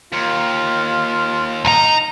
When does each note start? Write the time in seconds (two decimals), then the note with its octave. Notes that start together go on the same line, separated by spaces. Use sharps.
0.13 D#2 F4
1.65 B1 D#4 A#5